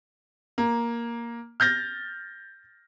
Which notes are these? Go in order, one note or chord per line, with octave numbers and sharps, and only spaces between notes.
A#3
F6 G6 A6 A#6